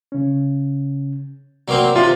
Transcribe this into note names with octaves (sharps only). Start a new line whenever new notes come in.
C#3 C#4
C3 F#3 A#3 C4 D5 D6
C3 F4 A#4 C5